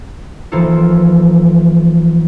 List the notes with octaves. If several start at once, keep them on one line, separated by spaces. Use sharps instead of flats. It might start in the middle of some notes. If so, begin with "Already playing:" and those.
E3 F3 A#3 D#4 F4 A4